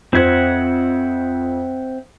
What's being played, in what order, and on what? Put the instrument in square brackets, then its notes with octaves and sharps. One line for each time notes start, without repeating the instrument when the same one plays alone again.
[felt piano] F2 C5 G#6 [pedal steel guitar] C4 E5 F#5